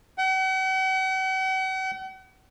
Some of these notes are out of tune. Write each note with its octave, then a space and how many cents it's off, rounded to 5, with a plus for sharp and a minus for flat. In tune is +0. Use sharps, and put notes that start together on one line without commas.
F#5 +45